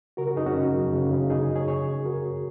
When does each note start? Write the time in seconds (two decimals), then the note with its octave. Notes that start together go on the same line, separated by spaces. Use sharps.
0.17 C#3 F#4 A#4
0.27 F#4 A#4
0.36 F#2 D#4 G#4
0.46 C#4 F#4
0.55 C#3
0.74 F#2
0.94 C#3
1.12 C#3
1.30 C#3 D#4 G#4
1.50 C#3
1.56 G#4 C#5
1.68 C#3 G#4 C#5
1.87 C#3
2.05 F#2 F#4 A#4
2.24 C#3